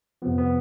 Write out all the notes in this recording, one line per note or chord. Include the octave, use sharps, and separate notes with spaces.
F2 C3 F3 B3
B3